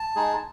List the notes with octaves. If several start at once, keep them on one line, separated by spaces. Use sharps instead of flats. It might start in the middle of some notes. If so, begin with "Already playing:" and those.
Already playing: A5
G#3 D#4 G#4